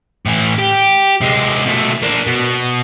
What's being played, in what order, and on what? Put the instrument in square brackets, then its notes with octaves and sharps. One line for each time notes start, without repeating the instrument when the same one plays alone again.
[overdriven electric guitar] A2 E3
G4
C3 G#3
B2 A3
A#3 D4
B2